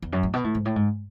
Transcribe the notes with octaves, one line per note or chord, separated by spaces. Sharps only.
E2
F#2
A2
B2
A2
G#2
A2
G#2